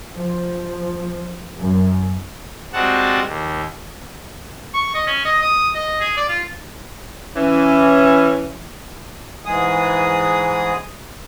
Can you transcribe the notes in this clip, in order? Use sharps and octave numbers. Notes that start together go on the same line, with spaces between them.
F3
F#2
G3 G#3 C4 F#4 F#5 A5
D#2
C#6
D#5
C#4
D#5
D#6
D#5
G#4
D5
F4
E3 C#4
G#2 E3 G#3 G#4 D#6